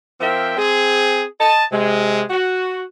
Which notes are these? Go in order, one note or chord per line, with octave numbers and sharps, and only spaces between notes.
F3 C4 A#4 E5 G5
C4 G#4
D#5 A5
C3 G#3
F#4